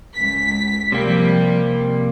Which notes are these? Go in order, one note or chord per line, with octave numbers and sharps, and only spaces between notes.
C#2 B6
C3 F3 G3 A#3